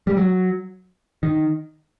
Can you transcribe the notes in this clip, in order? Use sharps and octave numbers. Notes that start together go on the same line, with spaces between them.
G3
F#3
D#3